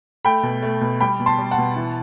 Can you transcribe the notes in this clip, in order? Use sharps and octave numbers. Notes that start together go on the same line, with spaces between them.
A3 G5 B5
B2
A3
B2
G3 G5 B5
B2
A5 C6
G3
F#5 A5
B2
E3